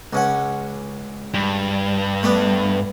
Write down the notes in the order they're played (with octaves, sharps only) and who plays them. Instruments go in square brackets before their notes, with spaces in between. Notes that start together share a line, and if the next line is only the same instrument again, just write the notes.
[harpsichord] C#2 C#4 F#5
[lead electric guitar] G2
[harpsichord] A3 B3 D4